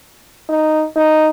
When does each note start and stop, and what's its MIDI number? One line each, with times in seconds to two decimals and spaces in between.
0.49 0.84 63
0.96 1.30 63